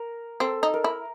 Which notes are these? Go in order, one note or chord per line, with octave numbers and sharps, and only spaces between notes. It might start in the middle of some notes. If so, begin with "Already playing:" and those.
Already playing: A#4
C4 A4
D#4
A#4
E4